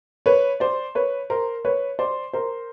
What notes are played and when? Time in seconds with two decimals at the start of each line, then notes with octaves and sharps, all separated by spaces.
0.26 B4 C#5
0.60 C5 D5
0.95 B4 C#5
1.30 A#4 C5
1.65 B4 C#5
1.99 C5 D5
2.33 A#4 C5